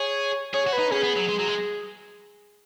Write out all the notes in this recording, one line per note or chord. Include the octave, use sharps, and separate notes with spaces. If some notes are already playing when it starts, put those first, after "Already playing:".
Already playing: G#4 C#5
G#4 C#5
F#4
B4
D#4
C#4 G#4
B3
F#3
G#3
F#3
G#3